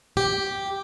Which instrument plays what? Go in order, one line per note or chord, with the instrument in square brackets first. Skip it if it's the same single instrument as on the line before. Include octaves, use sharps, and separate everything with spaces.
[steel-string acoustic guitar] G4